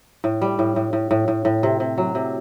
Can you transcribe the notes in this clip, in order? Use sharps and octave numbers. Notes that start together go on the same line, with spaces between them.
A2
G3
A2
A2
A2
A2
A2
A2
C3
C3
F#3
C3